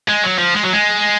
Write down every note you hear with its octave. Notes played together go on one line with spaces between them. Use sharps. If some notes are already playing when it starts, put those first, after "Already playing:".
G#3
F#3
F3
G#3
F#3
G#3